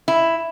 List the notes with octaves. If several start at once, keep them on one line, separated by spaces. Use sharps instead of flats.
E4